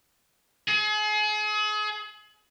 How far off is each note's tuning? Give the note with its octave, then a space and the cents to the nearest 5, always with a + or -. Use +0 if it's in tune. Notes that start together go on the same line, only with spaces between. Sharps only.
G#4 +35